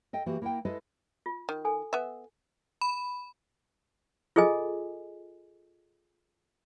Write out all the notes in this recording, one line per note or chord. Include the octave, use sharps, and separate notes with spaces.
A4 D#5 G5
E3 A#3 F#4 G4
A#3 E4 A#4 E5 F#5 G5
G#3 E4 A4 B4 D#5
F4
D#3
A4 G#5
B3 E5
B5
F4 G#4 A4 D#5 G#5